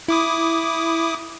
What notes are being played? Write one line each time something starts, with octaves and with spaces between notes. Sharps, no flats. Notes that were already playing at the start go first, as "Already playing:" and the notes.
E4 D6 D#6